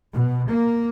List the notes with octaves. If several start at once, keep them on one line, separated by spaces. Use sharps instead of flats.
B2
A#3